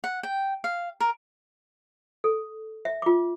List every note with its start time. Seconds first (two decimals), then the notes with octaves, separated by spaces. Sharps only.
0.04 F#5
0.23 G5
0.64 F5
1.00 A#4
2.24 A4
2.85 E5
3.02 F4 D6